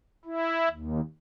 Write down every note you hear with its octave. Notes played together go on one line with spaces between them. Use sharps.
E4
D#2